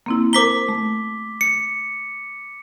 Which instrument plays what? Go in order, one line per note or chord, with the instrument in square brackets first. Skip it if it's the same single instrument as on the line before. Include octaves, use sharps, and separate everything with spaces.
[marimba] A#3 C4 E4
[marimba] A#4 C5 A#5 [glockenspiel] D6 B6 G7
[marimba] A3
[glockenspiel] C#7